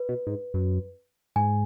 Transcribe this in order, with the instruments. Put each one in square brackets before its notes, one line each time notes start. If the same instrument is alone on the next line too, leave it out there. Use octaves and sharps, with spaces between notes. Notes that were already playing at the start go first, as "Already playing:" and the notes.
Already playing: [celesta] B4
[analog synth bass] B2
G#2
F#2
[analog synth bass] G#2 [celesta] G#5